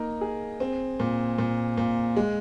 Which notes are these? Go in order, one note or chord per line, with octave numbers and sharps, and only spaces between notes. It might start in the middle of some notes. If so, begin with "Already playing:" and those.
Already playing: A#3 D#4
G#4
C4
A#2
A#2
A#2
G#3